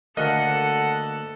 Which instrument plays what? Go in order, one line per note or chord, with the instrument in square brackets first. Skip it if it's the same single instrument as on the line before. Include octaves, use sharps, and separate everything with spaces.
[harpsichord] D2 D3 A#3 [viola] A4 [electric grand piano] D#5 [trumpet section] F#5